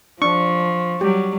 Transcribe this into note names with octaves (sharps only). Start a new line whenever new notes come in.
F3 D4 C#6
F#3 G3 G4